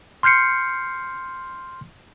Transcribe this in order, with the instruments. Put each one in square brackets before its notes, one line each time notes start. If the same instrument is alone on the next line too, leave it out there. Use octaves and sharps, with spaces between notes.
[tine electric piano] C6 F6 G6 C7 C#7